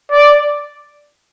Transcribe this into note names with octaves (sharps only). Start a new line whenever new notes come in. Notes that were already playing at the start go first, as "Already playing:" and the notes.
D5